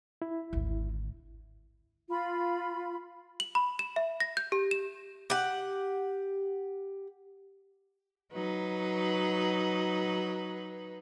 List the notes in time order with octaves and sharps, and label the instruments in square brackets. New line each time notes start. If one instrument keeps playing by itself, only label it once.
[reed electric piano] E4
[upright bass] G#1 D2
[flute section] F4 B5
[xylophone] F#7
B5
E7
E5
A#6
G6
G4
E7
[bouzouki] G4 F#5
[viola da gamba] F#3 D#4 B4